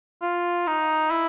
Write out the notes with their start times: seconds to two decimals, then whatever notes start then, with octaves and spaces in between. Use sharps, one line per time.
0.22 F4
0.67 D#4
1.11 E4